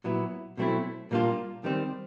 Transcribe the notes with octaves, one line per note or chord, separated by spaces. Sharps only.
A#2 F#3 B3 E4
B2 F#3 A3 C4 E4
A#2 G3 A#3 D4 F4
D#3 G3 C4